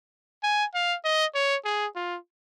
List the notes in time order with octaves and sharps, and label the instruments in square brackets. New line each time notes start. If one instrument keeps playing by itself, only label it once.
[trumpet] G#5
F5
D#5
C#5
G#4
F4